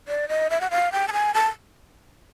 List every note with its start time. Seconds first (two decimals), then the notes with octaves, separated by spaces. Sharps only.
0.08 D5
0.29 D#5
0.50 E5
0.61 F#5
0.71 F5
0.92 G5
1.08 A5
1.13 G#5
1.34 A5